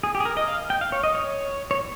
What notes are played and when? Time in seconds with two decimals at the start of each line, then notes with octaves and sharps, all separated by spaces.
0.03 G#4
0.15 G4
0.20 G#4
0.25 A#4
0.37 D#5
0.48 F5
0.70 G5
0.81 F5
0.92 C#5
1.04 D#5
1.15 C#5
1.71 C#5